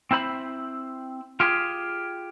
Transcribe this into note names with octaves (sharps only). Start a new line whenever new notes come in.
C4 E4 C5 B5
F4 G4 G#4